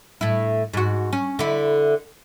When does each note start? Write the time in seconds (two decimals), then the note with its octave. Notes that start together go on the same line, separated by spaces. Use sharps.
0.21 A2 E4
0.73 G#2 F#4
1.13 C#4
1.39 D3 E4